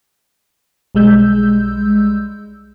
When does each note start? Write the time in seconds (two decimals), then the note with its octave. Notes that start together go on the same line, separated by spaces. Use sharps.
0.95 B1 G3 G#3 E6 G6